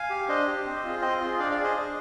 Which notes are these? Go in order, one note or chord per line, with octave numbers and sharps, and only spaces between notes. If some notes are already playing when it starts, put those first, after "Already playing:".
Already playing: F5 G#5
G4
D4 C5 D#5
G4
C4
F4 G#4
C4 C5 D#5
F4 G#4
D4 D5 F5
D5 F5
G#4
C5 D#5
D4